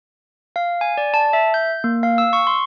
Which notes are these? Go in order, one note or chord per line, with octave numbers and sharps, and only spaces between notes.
F5
G#5
D5
A5
E5
G6
A#3
F5
E6
C#6
C6